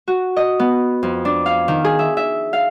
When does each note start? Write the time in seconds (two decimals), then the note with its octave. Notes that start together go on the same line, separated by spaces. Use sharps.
0.08 F#4
0.37 D#5
0.60 B3
1.03 F2
1.25 D4
1.46 F5
1.68 D#3
1.85 G#4
1.99 E5
2.17 E5
2.53 F5